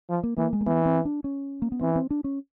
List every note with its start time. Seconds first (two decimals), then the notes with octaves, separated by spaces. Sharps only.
0.10 F3
0.23 A#3
0.38 E3 A#3
0.53 G#3
0.61 A#3
0.67 E3 B3
0.86 C4
1.05 D4
1.24 C#4
1.62 A#3
1.72 B3
1.81 E3 C4
1.96 C4
2.11 D4
2.24 C#4